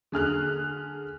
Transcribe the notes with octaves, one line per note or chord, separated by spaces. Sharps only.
D3 G#4 F6 F#6